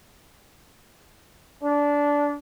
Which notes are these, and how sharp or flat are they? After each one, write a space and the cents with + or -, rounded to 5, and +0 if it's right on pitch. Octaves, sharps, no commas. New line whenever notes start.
D4 -15